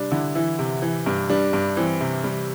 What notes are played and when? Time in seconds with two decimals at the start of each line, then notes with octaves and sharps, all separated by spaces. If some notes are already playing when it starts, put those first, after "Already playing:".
Already playing: C3 G3 D4
0.11 D3 E4
0.35 E3 E4
0.59 C3
0.82 E3
1.06 G2
1.30 G3 D4
1.53 G2
1.77 E3 C4
2.01 C3
2.24 G3